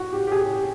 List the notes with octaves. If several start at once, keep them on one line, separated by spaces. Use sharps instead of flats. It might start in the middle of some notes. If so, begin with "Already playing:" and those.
Already playing: F#4
G4
G4
G#4